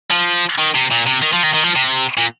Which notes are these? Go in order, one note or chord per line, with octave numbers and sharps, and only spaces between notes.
F3
D#3
C3
A#2
C3
D#3
F3
D#3
D#3
F3
C3
A#2